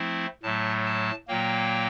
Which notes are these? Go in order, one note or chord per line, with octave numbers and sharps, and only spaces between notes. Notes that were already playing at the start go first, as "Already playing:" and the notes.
Already playing: F3 A3 C4 E4
A2 F#3 A3 A5
A5
A#2 F#3 A#3 G5